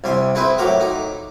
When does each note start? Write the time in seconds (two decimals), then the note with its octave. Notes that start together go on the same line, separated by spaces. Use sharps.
0.04 C2 C3 G#5 C6
0.35 C4 E4 G#4 B4 C5
0.58 A2 F#3 A#4 G5 D6
0.80 D#4 D6